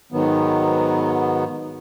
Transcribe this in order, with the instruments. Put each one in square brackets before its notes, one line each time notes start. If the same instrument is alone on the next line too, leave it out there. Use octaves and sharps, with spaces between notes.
[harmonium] G#2 D#3 F#3 B3